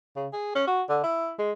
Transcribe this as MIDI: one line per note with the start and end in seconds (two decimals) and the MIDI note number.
0.16 0.28 49
0.33 0.51 68
0.55 0.65 61
0.67 0.82 66
0.89 1.01 50
1.04 1.33 64
1.39 1.52 56